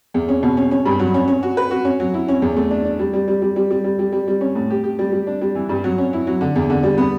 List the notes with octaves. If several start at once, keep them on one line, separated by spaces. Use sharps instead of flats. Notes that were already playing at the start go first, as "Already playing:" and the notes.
E2
C#4
B2
C#4
C#4
G2
F#3
C#4
C#4
F#4
B4
F#4
C#4
F#3
E4
C#4
E2
A3
D4
D4
G3
G3
G3
G3
G3
G3
G3
G3
G3
G3
C#4
A2
G4
G4
G3
G3
D4
G3
E3
G2
F#3
C#4
E4
F#3
D3
E2
D3
G3
B3